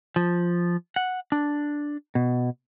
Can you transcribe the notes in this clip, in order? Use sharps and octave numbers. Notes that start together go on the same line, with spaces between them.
F3
F#5
D4
B2